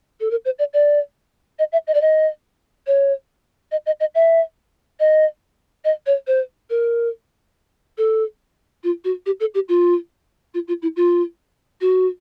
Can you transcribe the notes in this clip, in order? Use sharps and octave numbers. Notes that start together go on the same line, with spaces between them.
A4
A#4
C5
D5
D5
D#5
E5
D#5
D5
D#5
C#5
D#5
D#5
D#5
E5
D#5
D#5
C#5
C5
A#4
A4
F4
F#4
G4
A4
G4
F4
F4
F4
E4
F4
F#4